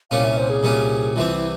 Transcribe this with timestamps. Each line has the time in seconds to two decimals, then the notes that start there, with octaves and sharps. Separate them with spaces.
0.11 C2 A#2 G3 C#4 F4 F5
0.24 E5
0.37 C5
0.50 G#4
0.63 C2 A#2 G3 C#4 F4
1.16 C2 C3 E3 G3 C4 F4
1.33 E4